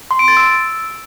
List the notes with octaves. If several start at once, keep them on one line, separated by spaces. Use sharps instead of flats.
C6
D7
A6
E6